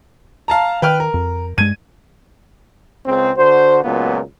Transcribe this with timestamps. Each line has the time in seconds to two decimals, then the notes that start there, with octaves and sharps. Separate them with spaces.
0.48 F5 A5 A#5
0.82 D#3 B4 G5 F6
1.00 A#4
1.14 F2
1.58 G2 G#3 G#6 D#7
3.06 C#2 C#3 C4
3.37 D3 F#4 C5
3.83 C#2 A#2 F#3 A#3 B3